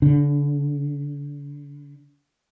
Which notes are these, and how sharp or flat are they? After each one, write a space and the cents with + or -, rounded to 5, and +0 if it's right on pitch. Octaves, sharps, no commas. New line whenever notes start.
D3 -35 D4 +0